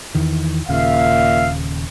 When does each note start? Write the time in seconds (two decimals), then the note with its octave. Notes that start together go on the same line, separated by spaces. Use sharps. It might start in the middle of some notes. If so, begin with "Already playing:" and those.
0.15 E2 D#3 E3
0.69 D#1 D#2 A#2 C#3 E5 F5